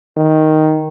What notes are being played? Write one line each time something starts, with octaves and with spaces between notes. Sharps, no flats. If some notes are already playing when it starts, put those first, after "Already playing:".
D#3